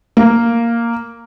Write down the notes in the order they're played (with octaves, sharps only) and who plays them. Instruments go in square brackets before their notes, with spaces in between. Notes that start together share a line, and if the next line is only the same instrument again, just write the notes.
[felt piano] A#3